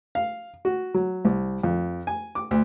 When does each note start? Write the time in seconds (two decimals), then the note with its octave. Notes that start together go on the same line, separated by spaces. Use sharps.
0.15 F5
0.65 F#4
0.94 F#3
1.25 C2
1.64 F2
2.07 G#5
2.35 D6
2.51 D2